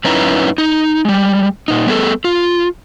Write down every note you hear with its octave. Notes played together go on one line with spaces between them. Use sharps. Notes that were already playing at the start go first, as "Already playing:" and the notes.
F#2 C#4 D#4 E4 B4 A#5
D#4
G3 G#3
A#2 D#4
G3 B3 G#4 A4
F4